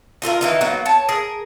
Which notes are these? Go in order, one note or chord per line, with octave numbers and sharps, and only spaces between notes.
D#4 F4 A4 A#4
D#3 E3 D#4
F#3 A#3 B3 D#4
C#5 A5
G#4 A#4